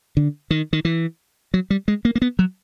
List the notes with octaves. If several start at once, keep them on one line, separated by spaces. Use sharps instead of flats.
D3
D#3
D#3
E3
F#3
G3
G#3
A#3
A#3
B3
F#3